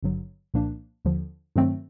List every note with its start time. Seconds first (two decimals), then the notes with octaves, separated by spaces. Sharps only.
0.03 G#1 G2 D3 F#3
0.54 C2 A#2 F3 A#3 D4
1.05 D#2 D3 F3
1.56 G2 D#3 F#3 A3 C4